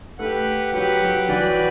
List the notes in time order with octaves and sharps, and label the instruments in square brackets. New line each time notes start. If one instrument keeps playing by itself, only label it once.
[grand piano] A3 [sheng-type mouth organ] G4 B4 F#5
[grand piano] F#3 [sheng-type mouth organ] G4 B4 F#5
[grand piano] F#3
[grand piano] E3 [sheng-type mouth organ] F#4 B4 D5 G5
[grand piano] F#3